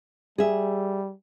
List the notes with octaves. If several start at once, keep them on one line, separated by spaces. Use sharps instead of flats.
G3 G#4 E5